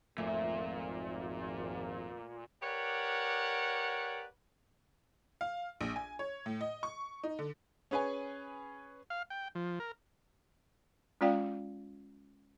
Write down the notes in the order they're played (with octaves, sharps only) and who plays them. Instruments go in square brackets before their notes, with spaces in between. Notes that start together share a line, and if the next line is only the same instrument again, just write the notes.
[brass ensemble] G#1 F2 [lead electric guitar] A#2 [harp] A3
[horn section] G4 A#4 B4 C#5 D5 F#5
[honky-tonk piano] F5
A#1
G#5
C#5
A2
D#5
C#6
D#4
D3
[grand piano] C#4 G#4 B4 C#5 G#5
[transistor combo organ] F5
G5
F3
A#4
[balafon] G#3 C#4 F4 D5 F5 G5